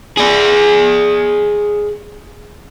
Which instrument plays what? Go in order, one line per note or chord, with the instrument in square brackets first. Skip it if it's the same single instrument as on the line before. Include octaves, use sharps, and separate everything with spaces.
[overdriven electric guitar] G#4 D5